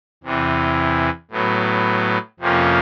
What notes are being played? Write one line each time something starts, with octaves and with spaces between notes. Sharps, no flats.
E2 C3 E3
A2 F#3 B3
F2 C3 F3 A#3 C#4